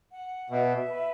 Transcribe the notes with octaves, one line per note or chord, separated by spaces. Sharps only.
F#5
B2 E5
B4